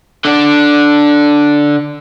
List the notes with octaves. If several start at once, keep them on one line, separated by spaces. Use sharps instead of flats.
D3 D4